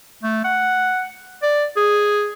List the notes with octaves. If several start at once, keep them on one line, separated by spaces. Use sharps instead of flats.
A3
F#5
D5
G#4